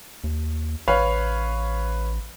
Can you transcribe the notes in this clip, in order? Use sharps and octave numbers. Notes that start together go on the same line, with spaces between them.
D#2
A1 B4 C#5 F5